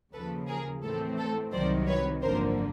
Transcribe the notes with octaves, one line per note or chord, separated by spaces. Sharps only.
D#2 C#3 F3 A4 B4
G#4 A#4
A2 E3 A3 C4 A4
A4
C2 C3 D#3 F#3 C5 D5
B4 C#5
G#1 F#2 D3 F3 A#3 A#4 C5